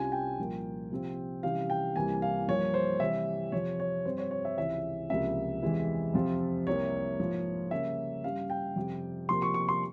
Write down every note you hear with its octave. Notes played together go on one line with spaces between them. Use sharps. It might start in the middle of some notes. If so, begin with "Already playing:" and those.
Already playing: C2 C3 G3 C#4 F4 G#5
G5
C2 A#2 F3 A#3 F4
C3 F3 C4 F4
C3 E3 G3 C#4 E4 F5
G5
C2 C3 E3 A#3 G#5
F5
G2 F3 A#3 C#5
C5
C3 E3 G3 E5
F2 C3 F3 C#5
C#5
G2 G3 C4 C5
C#5
C#5
E5
C#2 C3 E3 G#3 E4 E5
C#2 C3 F3 A#3 C#4 E5
E2 C3 E3 G#3 E4
F2 C3 F3 C4 F4
C2 C3 G3 A#3 C#5
G#2 F3 A#3 F4
C#3 G3 A#3 C#4 E5
G2 G3 C#4 F5
G5
F2 C3 G3
C3 F3 A#3 C6
C#6
C#6
C6